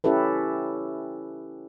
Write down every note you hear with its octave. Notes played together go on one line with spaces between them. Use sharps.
C#4 E4 G4 A4 B4